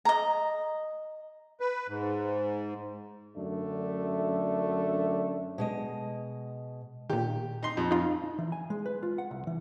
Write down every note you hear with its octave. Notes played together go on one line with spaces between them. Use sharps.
D#5 A#5
B4
G#2
F#2 D3 A3 D4
B2 G#3 D#5
A#2 D#3 G4
D#4 C6
F2
D#4 F4
D#4
E3
G#5
G#3
B4
F4
F#5
C2
E3